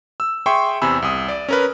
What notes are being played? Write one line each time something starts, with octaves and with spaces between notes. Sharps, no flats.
E6
G#4 E5 G5 C6 C#6
E2 C3 G#5 B5 E6
C2 D#6
D5
C#4 A#4 B4